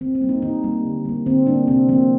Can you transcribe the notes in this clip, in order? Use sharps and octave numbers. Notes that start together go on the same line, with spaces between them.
D#3 C4
C4
G3 A#3
D#4
D#3 D#4
G3 A#3
D3
G3 A#3
D3 C4
G3 A#3 D4
C3 C4
F3 A#3 C4